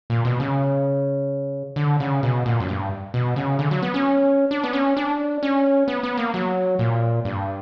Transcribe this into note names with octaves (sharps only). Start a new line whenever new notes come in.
A#2
B2
C#3
D3
C#3
B2
A#2
F#2
G2
B2
C#3
D3
F#3
B3
C#4
D4
B3
C#4
D4
C#4
B3
B3
A#3
F#3
A#2
G2